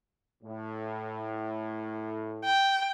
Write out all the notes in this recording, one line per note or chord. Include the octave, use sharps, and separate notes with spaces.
A2
G5